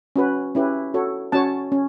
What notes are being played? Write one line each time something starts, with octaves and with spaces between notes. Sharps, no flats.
C#4 F#4 B4
C#4 E4 G4 B4
F#4 A4 C#5
C#4 F#4 C#5 A5
C#4